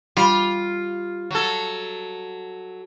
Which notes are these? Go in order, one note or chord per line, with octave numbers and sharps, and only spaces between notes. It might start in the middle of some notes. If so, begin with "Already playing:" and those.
G3 F4
F#3 A4